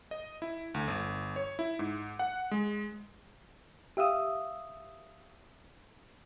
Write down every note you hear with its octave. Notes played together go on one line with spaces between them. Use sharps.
D#5
E4
D2
G1
C#5
E4
G#2
F#5
G#3
G4 E5 F5 D#6 E6